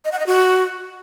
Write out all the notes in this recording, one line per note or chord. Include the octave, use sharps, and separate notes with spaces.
D#5
F#5
D#5
F#4